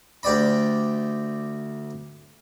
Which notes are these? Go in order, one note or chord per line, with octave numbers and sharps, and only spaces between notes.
D2 G4 D5 B5